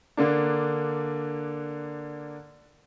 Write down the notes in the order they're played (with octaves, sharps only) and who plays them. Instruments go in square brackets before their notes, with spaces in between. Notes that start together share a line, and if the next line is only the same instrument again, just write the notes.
[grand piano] D3 A#3 D4